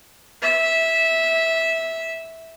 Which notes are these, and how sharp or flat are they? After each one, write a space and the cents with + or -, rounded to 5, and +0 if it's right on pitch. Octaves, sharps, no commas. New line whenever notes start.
E5 -10